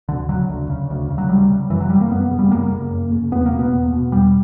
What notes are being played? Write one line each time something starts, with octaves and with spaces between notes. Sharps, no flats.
D2 D3
C#3 F#3
D2
C#3
D2
C#3
F#3
D2 G3
C#3
F#2 E3
F#3
C#3 G3
A#3
F#2 B3
C#3
G3
F#2 A#3
C#3
F#2
C#3
E2 B3
A#3
B2
B3
E2
B2
E2 G3